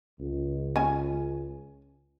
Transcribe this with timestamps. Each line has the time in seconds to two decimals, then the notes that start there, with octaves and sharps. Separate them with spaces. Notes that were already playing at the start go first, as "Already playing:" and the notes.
0.20 C#2
0.76 C#4 G#5